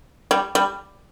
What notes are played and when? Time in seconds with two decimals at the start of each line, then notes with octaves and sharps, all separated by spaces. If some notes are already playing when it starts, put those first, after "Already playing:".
0.31 G3
0.55 G3